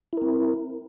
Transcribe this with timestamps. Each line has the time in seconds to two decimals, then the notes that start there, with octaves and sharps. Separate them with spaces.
0.13 E4
0.17 A#4
0.22 C4